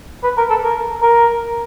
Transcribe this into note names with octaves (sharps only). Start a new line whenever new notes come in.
B4
A#4
A4
A#4
A#4